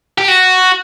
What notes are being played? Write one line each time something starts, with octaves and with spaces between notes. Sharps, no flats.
G4
F#4